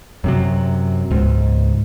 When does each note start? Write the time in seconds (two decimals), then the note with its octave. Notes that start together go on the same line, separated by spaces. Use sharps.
0.24 F#2 C3 F#3
1.11 C#2 G#2